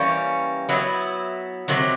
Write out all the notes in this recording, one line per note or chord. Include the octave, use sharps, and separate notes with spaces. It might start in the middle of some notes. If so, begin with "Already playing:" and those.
Already playing: E3 G3 A#3 C#4
F#3 B3 E4
C3 D#3 F#3